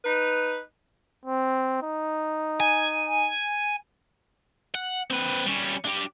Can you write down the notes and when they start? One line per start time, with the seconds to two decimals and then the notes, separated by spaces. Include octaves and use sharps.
0.05 D#4 B4
1.25 C4
1.83 D#4
2.60 G#5
4.75 F#5
5.10 C4 B4
5.46 G3 C#4
5.85 D4 G4